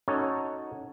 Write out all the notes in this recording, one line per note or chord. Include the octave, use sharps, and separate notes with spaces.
C#4 D#4 F#4 A4 C#5